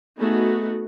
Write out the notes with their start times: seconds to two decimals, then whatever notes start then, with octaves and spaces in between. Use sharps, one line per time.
0.18 A3 B3 D#4 F#4 G#4